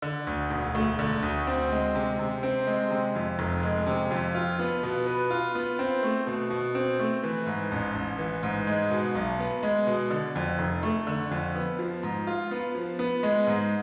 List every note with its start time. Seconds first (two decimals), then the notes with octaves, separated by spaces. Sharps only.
0.02 D3
0.27 D2
0.50 E1
0.75 A3
0.99 D3
1.23 D2
1.47 C4
1.71 G#3
1.95 C3
2.19 C3
2.43 C4
2.67 G#3
2.91 C3
3.15 F2
3.39 F1
3.63 G#3
3.87 C3
4.11 F2
4.35 F4
4.59 B3
4.83 B2
5.07 B4
5.31 F4
5.55 B3
5.79 C4
6.03 A3
6.27 B2
6.50 B2
6.75 C4
6.99 A3
7.23 E3
7.46 G#2
7.71 A1
7.95 A1
8.19 E3
8.43 G#2
8.67 G#3
8.90 B2
9.15 B1
9.39 B3
9.63 G#3
9.87 B2
10.10 D3
10.36 F2
10.59 F1
10.83 A3
11.07 D3
11.31 F2
11.55 B3
11.79 F3
12.03 G#2
12.27 F4
12.51 B3
12.75 F3
12.99 B3
13.23 G#3
13.47 G#2